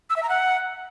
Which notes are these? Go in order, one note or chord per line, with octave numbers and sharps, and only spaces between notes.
E6
E5
A#5
F#5